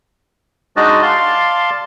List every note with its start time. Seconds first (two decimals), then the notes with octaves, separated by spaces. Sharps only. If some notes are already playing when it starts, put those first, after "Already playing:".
0.76 G#3 D4 D#4 F#4 D5 D#5
1.02 D5 F5 A5 C6